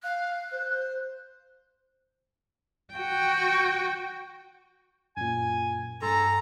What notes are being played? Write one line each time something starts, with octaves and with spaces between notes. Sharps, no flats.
F5 F#6
C5
F#4 G5
F#2 A#2 G#5
G2 A4 G#5 A#5 C6